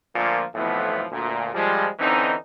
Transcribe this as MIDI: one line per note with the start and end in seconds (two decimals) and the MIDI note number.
0.15 0.43 46
0.15 0.43 50
0.15 0.43 53
0.15 0.43 57
0.15 0.43 58
0.55 1.04 35
0.55 1.04 41
0.55 1.04 45
0.55 1.04 52
0.55 1.04 53
0.55 1.04 59
1.11 1.49 38
1.11 1.49 46
1.54 1.87 53
1.54 1.87 55
1.54 1.87 56
1.99 2.34 50
1.99 2.34 52
1.99 2.34 60
1.99 2.34 61
1.99 2.34 63